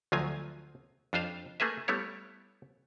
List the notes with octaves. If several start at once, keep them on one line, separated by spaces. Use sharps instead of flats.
D2 F3 F#3 F4 G#5
F2 D4 F4 C5 F5
A3 A#3 G#4 B4 E5
G3 A3 B3 E4 C#5